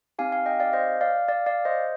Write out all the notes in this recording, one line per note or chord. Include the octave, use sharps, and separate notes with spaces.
C4 D#4 G4 F5 G#5
F5 G#5
D#5 G5
D5 F5
C5 D#5
D5 F5
D5 F5
D5 F5
C5 D#5